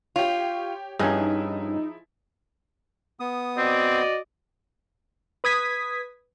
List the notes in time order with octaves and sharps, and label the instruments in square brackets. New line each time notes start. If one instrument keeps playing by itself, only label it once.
[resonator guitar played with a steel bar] F4 [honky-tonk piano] G4 C#5
[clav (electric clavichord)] G2 C#4 [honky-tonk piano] F3 E4 [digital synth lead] D#4 [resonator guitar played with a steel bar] G#4
[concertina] B3 D#6
[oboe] C4 [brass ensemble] F#4 D5 D#5
[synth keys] B4 D#6 G#6 B6